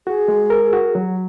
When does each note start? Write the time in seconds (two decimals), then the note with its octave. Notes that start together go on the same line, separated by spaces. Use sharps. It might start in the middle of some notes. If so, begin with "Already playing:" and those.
0.07 F#4 G#4
0.28 G#3
0.50 A#4
0.73 F#4
0.95 F#3